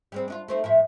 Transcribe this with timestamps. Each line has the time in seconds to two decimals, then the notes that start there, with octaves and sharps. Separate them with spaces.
0.12 G3 G#3 C4
0.28 D4 D#4 F4
0.48 A3 C4 D#4
0.64 A2 F3 E5